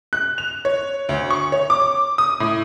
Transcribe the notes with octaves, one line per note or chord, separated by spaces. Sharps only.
F#6
F7
C#5
D2
C#6
C#5
D6
D#6
A2